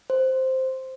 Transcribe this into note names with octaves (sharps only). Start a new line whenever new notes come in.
C5